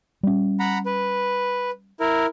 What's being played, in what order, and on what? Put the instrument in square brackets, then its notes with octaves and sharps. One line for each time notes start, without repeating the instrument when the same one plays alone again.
[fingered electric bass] G3 C#4
[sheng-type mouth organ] F#5 A#5 B5
B4
E4 A#4